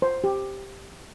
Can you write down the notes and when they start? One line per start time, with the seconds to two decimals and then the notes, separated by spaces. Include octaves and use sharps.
0.02 C5
0.24 G4